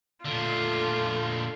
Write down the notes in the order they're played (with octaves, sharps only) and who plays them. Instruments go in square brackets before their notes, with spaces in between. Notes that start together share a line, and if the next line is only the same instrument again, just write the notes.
[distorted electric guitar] A#2 D3 [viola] A3 F4